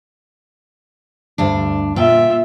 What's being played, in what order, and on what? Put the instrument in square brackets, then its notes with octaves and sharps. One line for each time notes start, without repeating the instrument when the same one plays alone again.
[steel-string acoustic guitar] D2 G2 D4
[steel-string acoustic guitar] A#2 G5 [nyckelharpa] F4 E5